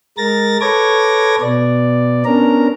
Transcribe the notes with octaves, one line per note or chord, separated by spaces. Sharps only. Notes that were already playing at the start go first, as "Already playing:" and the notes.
G#3 A#4 A6 A#6
A4 B4 C#5 D6 G#6 A#6
B2 B3 D5
B3 C#4 D4 A#4 A#5